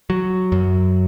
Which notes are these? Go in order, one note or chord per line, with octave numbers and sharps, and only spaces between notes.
F#3
F#2